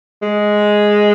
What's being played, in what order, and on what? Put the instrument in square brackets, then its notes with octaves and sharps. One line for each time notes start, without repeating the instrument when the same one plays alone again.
[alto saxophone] G#3